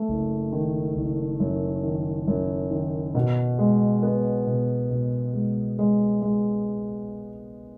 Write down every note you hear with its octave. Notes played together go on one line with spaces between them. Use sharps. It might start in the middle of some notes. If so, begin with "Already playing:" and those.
Already playing: A3
F#1
D#3
F#1
F#2
D#3
F#2
D#3
B2
G#3
B3
B2
B2
G#3
G#3
G#3